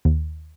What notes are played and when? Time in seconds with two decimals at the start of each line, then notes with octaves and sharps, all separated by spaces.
0.05 D#2